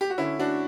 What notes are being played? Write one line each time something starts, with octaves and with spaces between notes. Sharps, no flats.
G4
F#4
D3 C#4 E4
C#4 D4 F#4